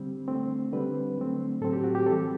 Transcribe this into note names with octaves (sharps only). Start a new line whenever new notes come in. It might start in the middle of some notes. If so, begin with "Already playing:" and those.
Already playing: D3 G3 C4
D3 A3 C4
D3 G3 C4 B4
D3 F#3 A3 C4
A2 F#3 C4 A4
G4
F#4
G4
E3 G3 C4 A4